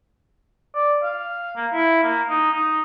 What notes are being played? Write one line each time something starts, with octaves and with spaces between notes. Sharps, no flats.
D5
F5
A#3
E4
A#3
D#4
D#4